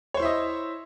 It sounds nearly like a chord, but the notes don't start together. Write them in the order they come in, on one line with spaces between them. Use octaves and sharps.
C#5 C5 E4 E5 D#5